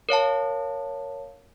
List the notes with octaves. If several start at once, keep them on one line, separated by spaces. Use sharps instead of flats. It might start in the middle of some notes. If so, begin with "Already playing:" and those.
A#4 C#5 F5 A5